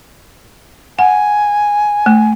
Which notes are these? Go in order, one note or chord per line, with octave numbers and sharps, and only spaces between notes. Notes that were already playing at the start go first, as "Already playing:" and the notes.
F#5 G#5
A3